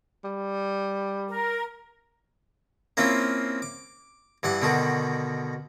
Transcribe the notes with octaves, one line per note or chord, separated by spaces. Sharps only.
G3
A#4
A#3 C4 C#4 E4 F4
D6
G2 E3 F#5 D6
B2 D3 D#3 F#4